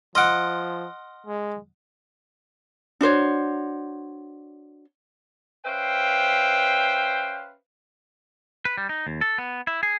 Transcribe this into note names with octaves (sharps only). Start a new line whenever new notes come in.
F3 D#5 F#5 C6 F6 D7
G#3
D4 F#4 C5 C#5
C#4 B4 C5 E5 F5 G5
B4
G3
D#4
D#2
A4
B3
E4
G#4